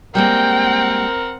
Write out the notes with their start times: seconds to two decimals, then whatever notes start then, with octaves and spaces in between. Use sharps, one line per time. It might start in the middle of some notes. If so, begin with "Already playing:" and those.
0.15 G3 G#3 A#3 C4 A#4 F#5 G5